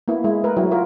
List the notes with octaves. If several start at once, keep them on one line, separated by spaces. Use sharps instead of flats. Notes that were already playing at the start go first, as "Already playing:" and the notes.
A#3 B3 E4
G#3 E4
A3 A#4 B4
F#3 E4
F4 A#4 C#5